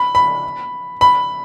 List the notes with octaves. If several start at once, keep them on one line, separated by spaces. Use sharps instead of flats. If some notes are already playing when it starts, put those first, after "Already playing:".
Already playing: B5
B5
B5